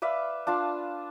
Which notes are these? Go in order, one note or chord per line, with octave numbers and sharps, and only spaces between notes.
B4 D5 E5 F5
D4 F4 A5